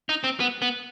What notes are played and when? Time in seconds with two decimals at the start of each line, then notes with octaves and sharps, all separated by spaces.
0.09 D#4
0.24 C4
0.40 B3
0.62 B3